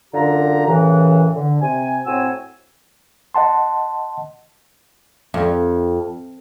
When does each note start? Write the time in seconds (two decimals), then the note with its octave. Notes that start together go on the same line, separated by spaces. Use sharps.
0.13 F#2 D3 F4 G4 A#5
0.67 F#2 A2 C#3 E3
1.35 D3
1.60 C3 G#5
2.06 A2 C4 F#4 C#5 G#5 E6
3.34 D#5 F#5 A5 C6
5.34 F2